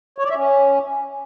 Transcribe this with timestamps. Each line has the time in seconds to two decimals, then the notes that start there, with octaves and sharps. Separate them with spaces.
0.18 C#5
0.24 D5
0.30 E5
0.35 C#4